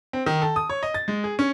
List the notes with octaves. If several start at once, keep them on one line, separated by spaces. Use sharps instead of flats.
C4
D#3
A4
D#6
C#5
D#5
A6
G#3
G#4
C#4